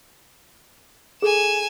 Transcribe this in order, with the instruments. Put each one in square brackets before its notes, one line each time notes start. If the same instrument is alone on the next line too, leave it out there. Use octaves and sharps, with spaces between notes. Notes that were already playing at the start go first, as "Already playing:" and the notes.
[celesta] G#4 A4 [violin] G#5 E7